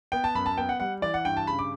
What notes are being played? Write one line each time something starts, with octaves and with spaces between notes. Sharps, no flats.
B3 G5
A5
F#2 B5
A5
B3 G5
F#5
G3 F#5
E3 D5
F#5
G2 G5
A5
C#3 B5
D6